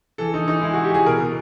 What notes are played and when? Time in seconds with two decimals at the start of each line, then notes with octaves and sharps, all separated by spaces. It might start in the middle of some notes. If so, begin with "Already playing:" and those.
0.18 E3 A4
0.34 E3 D#4
0.48 E3 D#4
0.62 G#3 E4
0.74 G#3 F#4
0.84 G4
0.91 E3 G#4
1.06 B2 A#4
1.20 B2